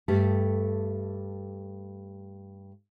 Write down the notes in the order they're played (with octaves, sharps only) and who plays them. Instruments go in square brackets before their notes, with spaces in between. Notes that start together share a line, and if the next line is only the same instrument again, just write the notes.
[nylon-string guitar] G2 A3 G4 A4